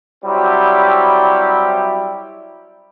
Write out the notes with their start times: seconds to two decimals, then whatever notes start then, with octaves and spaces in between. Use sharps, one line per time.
0.24 F#3 G3 C4 E4 G4